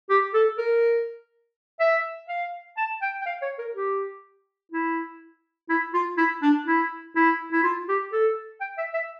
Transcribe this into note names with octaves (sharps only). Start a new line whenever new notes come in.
G4
A4
A#4
E5
F5
A5
G5
G5
F5
C#5
A#4
G4
E4
E4
F4
E4
D4
E4
E4
E4
F4
G4
A4
G5
E5
E5